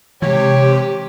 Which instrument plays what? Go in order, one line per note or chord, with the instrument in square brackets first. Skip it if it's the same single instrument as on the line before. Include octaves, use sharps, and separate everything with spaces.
[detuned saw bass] C3 [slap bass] E3 G#3 [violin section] G4 [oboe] C#5